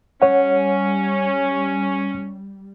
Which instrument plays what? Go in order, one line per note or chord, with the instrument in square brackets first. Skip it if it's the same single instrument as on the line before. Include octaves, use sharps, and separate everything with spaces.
[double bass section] G3 [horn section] C#4 [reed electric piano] C#5 F#5